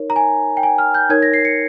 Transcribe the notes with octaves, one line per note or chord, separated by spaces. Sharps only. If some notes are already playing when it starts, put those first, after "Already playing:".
Already playing: D#4 A#4 C#5
A#5
G#5
G5
G#5
F6
G6
D#4 A#4 C#5 G#6
A#6
C7
C#7